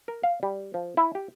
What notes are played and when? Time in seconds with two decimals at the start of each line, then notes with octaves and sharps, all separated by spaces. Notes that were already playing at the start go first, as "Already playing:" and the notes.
0.08 A#4
0.23 F5
0.43 G3
0.74 F3
0.97 E4
1.15 G4